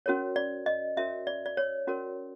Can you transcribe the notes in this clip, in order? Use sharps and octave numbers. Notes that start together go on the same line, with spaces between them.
C#4 F#4 A#4 C#5
D5
D#5
C#4 F#4 A#4 C#5 E5
D5
D5
C#5
C#4 F#4 A#4 C#5